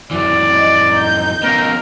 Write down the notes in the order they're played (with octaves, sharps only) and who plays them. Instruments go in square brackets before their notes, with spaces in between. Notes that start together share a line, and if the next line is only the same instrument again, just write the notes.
[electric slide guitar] F#2 E3 [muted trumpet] D5
[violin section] D#5
D#4 G6
[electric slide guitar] B3 C#4 F4 [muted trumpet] A#4